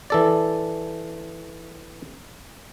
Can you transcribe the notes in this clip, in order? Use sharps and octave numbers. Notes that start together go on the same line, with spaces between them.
E3 A4 D5